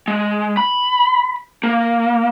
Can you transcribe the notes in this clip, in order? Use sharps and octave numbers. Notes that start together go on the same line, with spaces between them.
G#3
B5
A#3